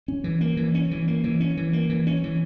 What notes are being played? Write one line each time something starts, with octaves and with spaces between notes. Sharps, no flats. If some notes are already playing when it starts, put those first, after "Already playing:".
C#4
E3
A#3
E3
C#4
E3
A#3
E3
C#4
E3
A#3
E3
C#4
E3